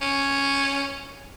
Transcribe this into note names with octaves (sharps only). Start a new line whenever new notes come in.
C#4